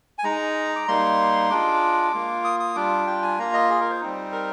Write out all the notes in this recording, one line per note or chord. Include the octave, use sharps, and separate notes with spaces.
G#5
G#3 D#4 A#5
D6
G3 A#3 D#4 C6
G#3 D4 F4 D6
A#3 F4
D#6
D#6
G3 D4 F4 D6
G5
G#5
A#3 F4 A#5
D#5
G#4
A#4
C5
G3 C4 D#4
A#4